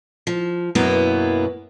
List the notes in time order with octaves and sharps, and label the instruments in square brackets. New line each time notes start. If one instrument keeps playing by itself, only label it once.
[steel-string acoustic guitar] F3
F#2 B2 F#3 A#3 B3 E4